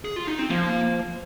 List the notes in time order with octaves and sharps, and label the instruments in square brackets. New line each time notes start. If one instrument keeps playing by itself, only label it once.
[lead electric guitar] G#4
F4
D#4
C4
[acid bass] F3 [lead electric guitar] A#3